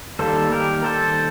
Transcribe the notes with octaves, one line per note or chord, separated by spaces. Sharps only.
D#3 G3 A#3 A4 C5
G4 A#4
A4 C5